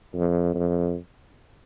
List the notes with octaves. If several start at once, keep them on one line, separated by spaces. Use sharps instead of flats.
F2
F2